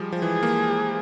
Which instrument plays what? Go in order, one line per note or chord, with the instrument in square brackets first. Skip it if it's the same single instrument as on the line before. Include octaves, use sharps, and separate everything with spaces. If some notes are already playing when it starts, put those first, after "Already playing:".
Already playing: [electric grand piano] F3 G3 G#3
F3
[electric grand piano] E3 [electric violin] G#4
[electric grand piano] A#3